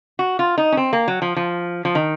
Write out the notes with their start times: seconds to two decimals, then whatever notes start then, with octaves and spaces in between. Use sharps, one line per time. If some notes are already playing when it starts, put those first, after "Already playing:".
0.19 F#4
0.39 F4
0.58 D#4
0.72 C#4
0.77 C4
0.93 A#3
1.08 F#3
1.22 F3
1.36 F3
1.85 F3
1.95 D#3